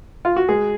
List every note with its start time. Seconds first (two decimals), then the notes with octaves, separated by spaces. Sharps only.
0.25 F4
0.36 F#4
0.49 G#3 G#4